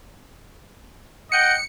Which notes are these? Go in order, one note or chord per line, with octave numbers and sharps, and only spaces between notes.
D#5 F#5 G5 C#7